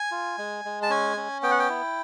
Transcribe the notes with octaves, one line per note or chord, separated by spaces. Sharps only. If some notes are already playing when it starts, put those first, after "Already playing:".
Already playing: G#5
F4
G#3
G#3
A5
C#4 G#5
C#4
B3 G5
F#5
G5
E4